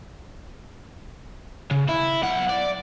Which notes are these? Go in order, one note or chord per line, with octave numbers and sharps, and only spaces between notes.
C#3
E4
B1 F#5
D5